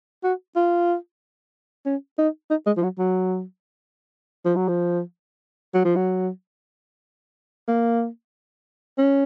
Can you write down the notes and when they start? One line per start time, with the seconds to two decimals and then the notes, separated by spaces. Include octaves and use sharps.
0.24 F#4
0.56 F4
1.86 C#4
2.19 D#4
2.51 D#4
2.66 G#3
2.77 F3
2.83 F#3
2.99 F#3
4.46 F3
4.56 F#3
4.68 F3
5.75 F#3
5.85 F3
5.96 F#3
7.68 A#3
8.98 C#4